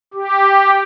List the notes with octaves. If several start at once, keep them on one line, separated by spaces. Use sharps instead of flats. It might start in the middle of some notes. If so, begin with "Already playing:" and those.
G4